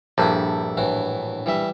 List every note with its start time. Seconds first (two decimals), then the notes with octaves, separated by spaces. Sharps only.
0.18 A#1 G2 E4 A4 D5
0.77 A2 E3 F#4
1.46 E3 G3 E5